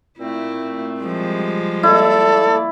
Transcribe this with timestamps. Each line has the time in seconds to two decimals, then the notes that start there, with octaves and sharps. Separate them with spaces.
0.19 A#2 A3 C4 E4
1.01 F3 G3 G#3
1.83 A3 A#3 E4 A4 D5